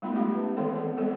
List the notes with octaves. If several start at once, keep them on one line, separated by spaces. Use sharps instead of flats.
G3 A3 B3 D#4 F4
G#3 B3 D#4 G4 F5
C#4 B4
D#3 E3 B3 C4 A4 C#5
G#4 D5 F#5
G3 G#3 B3 C4 A4